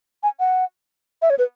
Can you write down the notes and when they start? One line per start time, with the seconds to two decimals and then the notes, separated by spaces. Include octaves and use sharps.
0.23 G#5
0.40 F#5
1.22 E5
1.30 C#5
1.39 B4